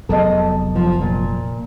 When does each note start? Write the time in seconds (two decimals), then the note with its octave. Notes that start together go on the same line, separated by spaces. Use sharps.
0.09 F1 F#3 B3 A4 D#5
0.75 F3
1.01 A#2